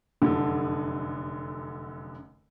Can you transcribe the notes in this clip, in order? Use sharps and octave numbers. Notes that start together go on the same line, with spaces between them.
F1 F#2 D3 A4